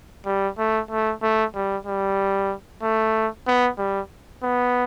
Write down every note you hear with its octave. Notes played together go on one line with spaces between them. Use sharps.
G3
A3
A3
A3
G3
G3
A3
B3
G3
B3